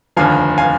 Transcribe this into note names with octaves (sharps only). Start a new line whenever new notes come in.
F1 D#2 D3 F3 F5 G#5
F5 G#5